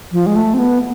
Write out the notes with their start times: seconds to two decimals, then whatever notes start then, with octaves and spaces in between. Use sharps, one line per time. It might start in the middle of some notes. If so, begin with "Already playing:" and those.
0.12 F3
0.26 G#3
0.36 A3
0.54 C4
0.59 B3